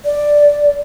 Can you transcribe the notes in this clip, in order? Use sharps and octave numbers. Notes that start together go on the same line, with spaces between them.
D5